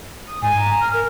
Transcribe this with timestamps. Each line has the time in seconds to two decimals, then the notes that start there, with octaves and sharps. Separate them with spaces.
0.26 D#6
0.42 G#2 G#5
0.58 A#5
0.81 F6
0.93 A#4